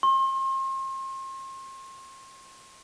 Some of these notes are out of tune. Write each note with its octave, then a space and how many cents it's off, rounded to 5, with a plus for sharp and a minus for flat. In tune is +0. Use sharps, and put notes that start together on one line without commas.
C6 +40